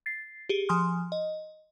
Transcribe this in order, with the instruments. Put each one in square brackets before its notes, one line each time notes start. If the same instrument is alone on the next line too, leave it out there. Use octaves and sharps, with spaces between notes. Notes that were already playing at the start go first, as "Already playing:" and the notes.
[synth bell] A6 C7
G4 G#4
F3 G#5 C6 D#6 F6
D#5